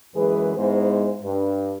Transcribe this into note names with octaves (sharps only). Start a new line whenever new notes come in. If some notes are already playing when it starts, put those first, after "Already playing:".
F#2 E3 G#3 G#4 B4
G#2 G#3 B3 E4 C5
G2